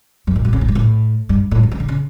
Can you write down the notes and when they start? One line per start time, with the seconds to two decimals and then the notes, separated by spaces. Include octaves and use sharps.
0.27 F#2
0.36 A2
0.45 B2
0.53 C#3
0.61 A2
0.68 G2
0.75 A2
1.29 G2
1.51 A2
1.63 B2
1.71 C#3
1.80 D3
1.88 C#3